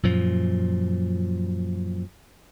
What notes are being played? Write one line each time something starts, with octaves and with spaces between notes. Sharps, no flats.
F#2 A#2 F3